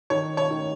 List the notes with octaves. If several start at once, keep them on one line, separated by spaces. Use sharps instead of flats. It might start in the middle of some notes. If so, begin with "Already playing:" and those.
D#3 C#5
C#5
D#3